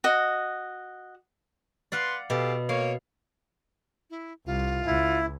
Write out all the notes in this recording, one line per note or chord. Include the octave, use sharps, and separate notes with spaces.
F#4 D#5
B4 D5 F5 F#5 C6
B2 G4 A4 F5
A#3 C#5 F5
E4
C2 F4
C#2 E4